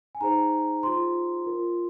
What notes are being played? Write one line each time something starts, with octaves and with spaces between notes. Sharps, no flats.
G#5
D#4 G#4 C5 A#5
F4 G#4 C5 C6
F4 A#4